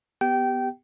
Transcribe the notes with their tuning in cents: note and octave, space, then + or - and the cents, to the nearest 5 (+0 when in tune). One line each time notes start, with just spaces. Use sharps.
B3 +10 G4 +0 G5 -20